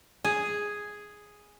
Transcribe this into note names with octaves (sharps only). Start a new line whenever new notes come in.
G#4